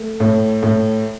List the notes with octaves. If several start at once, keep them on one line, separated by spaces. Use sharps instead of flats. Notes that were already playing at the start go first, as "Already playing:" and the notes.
Already playing: A3
A2
A2